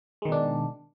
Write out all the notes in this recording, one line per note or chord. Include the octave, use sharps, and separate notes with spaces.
B2 D#3 G#3 D4